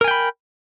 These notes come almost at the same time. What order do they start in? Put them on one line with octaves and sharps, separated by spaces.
A#4 G#5 G5 B5